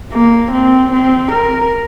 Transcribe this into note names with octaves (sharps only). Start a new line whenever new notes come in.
A#3
C4
C4
A#4